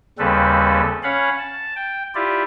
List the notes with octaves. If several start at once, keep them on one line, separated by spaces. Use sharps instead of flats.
D#2 C#3 G3 C4 A4 B4
C#4 C#5 F5 F#5 B5
A5
G5
E4 F4 G4 D5